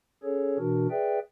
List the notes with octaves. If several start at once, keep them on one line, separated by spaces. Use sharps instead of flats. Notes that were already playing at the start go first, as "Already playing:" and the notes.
C#4 G#4 A4 C#5
B2 E3 D4 F#4 A#4
G#4 B4 D5 E5 G5